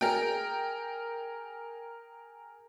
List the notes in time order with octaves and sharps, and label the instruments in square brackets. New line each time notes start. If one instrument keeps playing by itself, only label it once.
[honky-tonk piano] G#4 A#4 G5